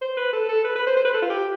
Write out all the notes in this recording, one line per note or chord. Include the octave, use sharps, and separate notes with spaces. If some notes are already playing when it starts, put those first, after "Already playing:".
C5
B4
A4
A4
B4
B4
C5
C5
B4
A4
F4
G4